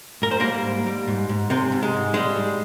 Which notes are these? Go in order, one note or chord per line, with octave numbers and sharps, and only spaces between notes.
G#2 A#4
C5
G3 A#3 A#4
G#2
G3
G#2
G#2
G#2 C3 C4
G#2
G#3
G#2
G3 G#3
G#2